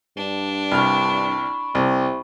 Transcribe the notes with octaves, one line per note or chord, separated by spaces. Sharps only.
G2 D4
C2 B5 C#6 F6
C2 C3